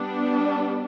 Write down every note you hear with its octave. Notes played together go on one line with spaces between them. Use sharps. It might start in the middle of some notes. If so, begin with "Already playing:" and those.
Already playing: G3 B3 D4